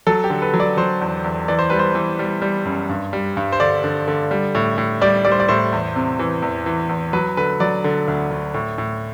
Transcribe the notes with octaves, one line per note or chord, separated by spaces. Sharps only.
F#3 A4
G4
D3
B4
F#3
D5
F#3 C5
E2
E2
E3 D5
C5
G3 B4
C5
E3
G3
G3
F#2
G2
G3
G2
C5
D3 D5
D3
D3
G3
A2
A2
G3 D5
G3 D5
C5
D5
A2 C5
E2
C3
E3
E2
E3
E2
F#3 B4
D3 B4
F#3 D5
D3
D2
D2
A2
A2